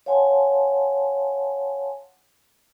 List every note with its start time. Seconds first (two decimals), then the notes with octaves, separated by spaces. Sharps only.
0.06 C#5 F5 F#5 G#5 A5 C6